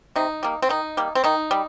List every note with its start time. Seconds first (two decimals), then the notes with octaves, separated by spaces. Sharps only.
0.16 C3 D#4
0.43 G3 A#3
0.62 C4
0.69 D#3 D#4
0.97 G3 A#3
1.15 C4
1.24 D#3 D#4
1.51 G3